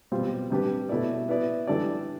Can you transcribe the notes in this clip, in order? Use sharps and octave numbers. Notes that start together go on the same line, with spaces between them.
B2 G3 C4 F4
C3 G3 D4 G4 B4
B2 A3 E4 B4 D5
B3 E4 B4 D5
E3 G3 D4 A4 D5